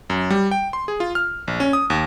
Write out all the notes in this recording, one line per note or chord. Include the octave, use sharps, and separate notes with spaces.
F#2
G3
G5
C6
G#4
F4
F6
A#1
C#4
D#6
D#2